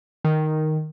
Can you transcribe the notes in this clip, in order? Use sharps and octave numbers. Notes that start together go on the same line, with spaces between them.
D#3